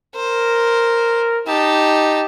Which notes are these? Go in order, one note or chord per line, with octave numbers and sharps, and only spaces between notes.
A#4 C5
D#4 G4 A5